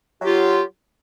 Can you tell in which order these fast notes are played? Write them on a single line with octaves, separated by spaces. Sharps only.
F#3 G4 F4